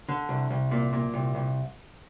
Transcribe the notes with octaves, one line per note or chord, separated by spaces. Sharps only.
D3
C2
C2
A#2
A#2
C2
C2